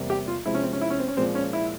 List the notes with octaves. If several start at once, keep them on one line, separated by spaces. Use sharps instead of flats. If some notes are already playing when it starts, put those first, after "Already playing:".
Already playing: E2 C3 G3 A#3
G4
F4
C3 F3 G#3 E4
C#4
C4
C#4
E4
C#4
C4
C#4
A#2 F3 G#3 C4
C#4
E4